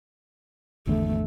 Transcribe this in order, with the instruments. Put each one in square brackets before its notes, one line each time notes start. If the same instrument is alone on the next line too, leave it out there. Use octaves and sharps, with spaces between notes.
[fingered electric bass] G#1 E2 D3 [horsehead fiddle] A3